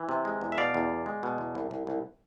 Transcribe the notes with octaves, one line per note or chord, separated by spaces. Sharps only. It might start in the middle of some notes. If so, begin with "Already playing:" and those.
Already playing: E3
C3
G#3
E2
E5
B2 D5 F5
E2
B2
G#3
B2
E2
C2
C2
C2